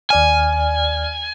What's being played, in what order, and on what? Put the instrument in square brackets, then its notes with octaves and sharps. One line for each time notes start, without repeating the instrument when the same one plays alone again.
[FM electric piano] D#2 D5 F6 [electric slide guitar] G#5